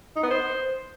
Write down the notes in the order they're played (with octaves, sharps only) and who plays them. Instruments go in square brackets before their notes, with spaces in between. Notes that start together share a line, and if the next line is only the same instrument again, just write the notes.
[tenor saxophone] D#4
B3
C5